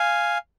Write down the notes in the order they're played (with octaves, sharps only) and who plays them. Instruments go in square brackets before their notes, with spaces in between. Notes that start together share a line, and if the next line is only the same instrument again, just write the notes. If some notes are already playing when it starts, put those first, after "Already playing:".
Already playing: [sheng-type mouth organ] F5 G#5